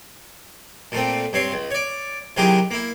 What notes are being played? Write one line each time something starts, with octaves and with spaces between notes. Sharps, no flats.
A#2 A3 C4
G2 C4 C#5 C6
C#2
C#5 D5
C3 D#3 F#3 G#3 E4 G4
A#3 E4